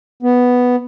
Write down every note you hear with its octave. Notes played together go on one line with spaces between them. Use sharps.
B3